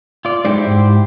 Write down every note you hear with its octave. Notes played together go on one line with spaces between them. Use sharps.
F4 D5
G#3 D#4 E4 G4 C5 D5
G#2